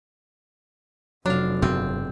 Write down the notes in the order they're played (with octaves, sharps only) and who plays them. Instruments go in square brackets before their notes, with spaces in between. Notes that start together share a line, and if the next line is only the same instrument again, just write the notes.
[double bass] F1 C3 [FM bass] F#3 [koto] D4 F5
[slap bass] F#1 G2 B2 [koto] C4